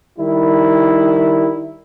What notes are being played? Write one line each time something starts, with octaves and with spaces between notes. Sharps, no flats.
D#3 G3 E4